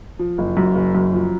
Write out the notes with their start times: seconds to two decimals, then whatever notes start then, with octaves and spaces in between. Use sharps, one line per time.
0.19 F3
0.38 F#1
0.57 F#2
0.75 F#1
0.95 F#2
1.13 F3